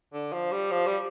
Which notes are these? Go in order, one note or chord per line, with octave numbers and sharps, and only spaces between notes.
D3
F3
G3
F3
G3